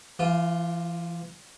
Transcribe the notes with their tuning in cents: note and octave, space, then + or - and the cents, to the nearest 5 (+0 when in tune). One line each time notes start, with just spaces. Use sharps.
E3 +40 F4 +0